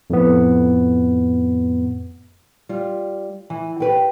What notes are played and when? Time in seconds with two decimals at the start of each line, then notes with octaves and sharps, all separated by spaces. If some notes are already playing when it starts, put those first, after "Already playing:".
0.10 F2 A2 B3
2.69 G3 F4
3.50 E3
3.80 G4 B4 G5